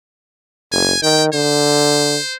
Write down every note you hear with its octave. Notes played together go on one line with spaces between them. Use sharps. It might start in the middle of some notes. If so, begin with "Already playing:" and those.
F#1 G#5
D#3 G5
D3 C5